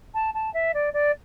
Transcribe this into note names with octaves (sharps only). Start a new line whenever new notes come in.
A5
A5
E5
D5
D5